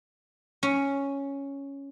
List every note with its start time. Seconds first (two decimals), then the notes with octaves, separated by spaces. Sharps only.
0.63 C#4